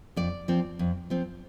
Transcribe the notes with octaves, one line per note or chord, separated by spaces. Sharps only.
F2 D5
F3 C4
F2
F3 C4